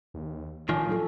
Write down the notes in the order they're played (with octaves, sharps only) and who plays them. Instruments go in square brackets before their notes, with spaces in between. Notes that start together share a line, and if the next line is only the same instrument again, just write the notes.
[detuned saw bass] D#2
[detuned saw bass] A1 [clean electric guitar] A2 D#3 F3 [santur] C#4 D4
[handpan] F#3 F4 A4